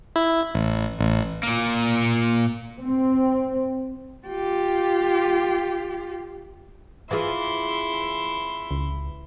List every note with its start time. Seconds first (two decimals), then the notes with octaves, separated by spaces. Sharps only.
0.16 E4
0.54 A1
0.98 A1
1.43 A#2 A#3
2.79 C4
4.27 F4 G4
7.11 E3 E4 F4 G#4 C6
8.71 C#2